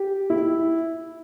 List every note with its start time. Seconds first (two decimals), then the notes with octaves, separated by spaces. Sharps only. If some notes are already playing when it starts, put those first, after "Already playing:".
Already playing: G4
0.30 E4